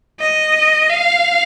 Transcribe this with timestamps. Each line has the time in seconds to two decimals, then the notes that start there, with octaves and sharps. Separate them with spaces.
0.20 D#5
0.90 F5